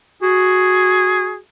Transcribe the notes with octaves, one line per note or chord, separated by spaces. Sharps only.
F#4 G#4